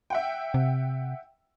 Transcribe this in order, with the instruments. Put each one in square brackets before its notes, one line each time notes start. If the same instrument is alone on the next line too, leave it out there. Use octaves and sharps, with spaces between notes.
[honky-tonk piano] E5 F#5 G5
[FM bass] C3